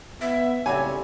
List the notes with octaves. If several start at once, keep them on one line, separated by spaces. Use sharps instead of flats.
B3 E5
B1 A2 C#3 G3 C4 C#5 E5 G#5